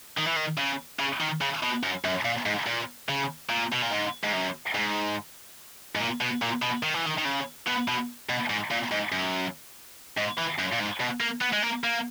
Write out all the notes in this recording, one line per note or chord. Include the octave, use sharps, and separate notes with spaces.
D#3
E3
D#3
C#3
C#3
D#3
C#3
B2
F#2
F#2
A#2
G#2
A#2
C#3
A#2
B2
A#2
G#2
G#2
F#2
G#2
G#2
A#2
B2
A#2
B2
D#3
E3
D#3
D#3
C#3
B2
B2
B2
G#2
A#2
G#2
F#2
G#2
E3
F#2
A#2
G#2
B2
A#3
B3
G#3
A#3
A#3